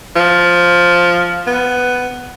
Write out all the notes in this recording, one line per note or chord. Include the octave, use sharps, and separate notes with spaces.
F3
B3